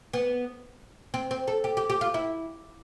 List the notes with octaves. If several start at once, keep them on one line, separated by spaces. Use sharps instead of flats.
B3
C4
C4
A4
G4
G4
G4
F4
E4